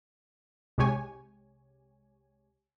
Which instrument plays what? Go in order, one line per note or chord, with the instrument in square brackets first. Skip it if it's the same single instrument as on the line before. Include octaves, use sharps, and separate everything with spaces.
[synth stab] C2 C3 G#3 G4 C#5 G#5